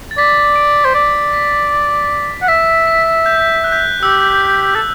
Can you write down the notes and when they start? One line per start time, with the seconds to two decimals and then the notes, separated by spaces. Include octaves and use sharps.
0.11 A6
0.18 D5 B6
0.56 D7
0.85 C5
0.95 D5 D7
1.33 B6
2.42 F#5
2.48 E5 B6
2.87 B6
3.26 G6
3.64 F#6
3.72 G6
3.80 F#6
4.03 G4 E6
4.75 A4